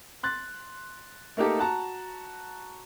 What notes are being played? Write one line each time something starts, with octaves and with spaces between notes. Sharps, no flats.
C6 F#6 A6
A3 A#3 D#4 G4 A4
F#4 A5 A#5